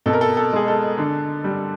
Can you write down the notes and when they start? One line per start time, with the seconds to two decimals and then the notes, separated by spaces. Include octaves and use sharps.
0.06 B2 A4
0.13 A#4
0.21 A4
0.37 A4
0.53 G#3 G#4
0.68 A4
0.98 D3
1.44 G3